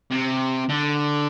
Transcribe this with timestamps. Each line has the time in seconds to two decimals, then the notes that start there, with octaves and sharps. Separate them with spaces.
0.11 C3
0.69 D3